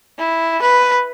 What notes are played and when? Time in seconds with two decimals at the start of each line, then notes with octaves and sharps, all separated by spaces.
0.18 E4
0.62 B4